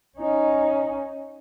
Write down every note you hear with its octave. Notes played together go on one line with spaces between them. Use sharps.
C#4 D#4